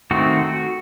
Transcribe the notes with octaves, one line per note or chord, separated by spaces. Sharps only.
D#3 A3 C4 F#4